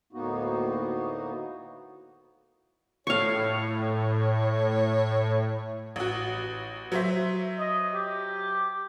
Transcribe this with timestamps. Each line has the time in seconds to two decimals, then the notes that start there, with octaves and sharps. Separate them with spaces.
0.13 D2 A2 A#3 B3 D#4 F#4
3.07 A2 C#5 F5 C#6
5.96 A1 F#4
6.92 F#3 C5 E5
7.59 D#5
7.94 G4